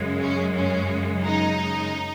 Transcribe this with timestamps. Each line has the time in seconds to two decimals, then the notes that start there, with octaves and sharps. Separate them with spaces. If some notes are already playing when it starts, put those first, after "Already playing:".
Already playing: F#2 C#3 G#3
0.21 C#4
0.56 C#4
1.25 D#4